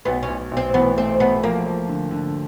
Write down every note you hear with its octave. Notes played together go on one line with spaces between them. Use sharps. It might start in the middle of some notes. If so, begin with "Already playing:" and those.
B1 B3
C#4
B1
B1
C4
E3 B3
A3 C4
A3 B3
F3 A#3
F3
D3
D3